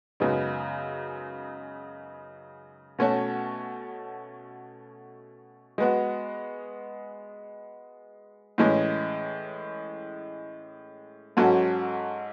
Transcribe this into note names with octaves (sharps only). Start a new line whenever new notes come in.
F#2 C#3 G#3 B3 D#4
B2 A3 C#4 F#4 C#5
G#3 B3 F#4
A2 E3 G#3 C#4
G#2 F#3 C#4 F#4 A4